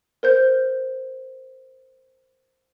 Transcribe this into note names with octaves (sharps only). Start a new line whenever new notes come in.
A#4 C5 G6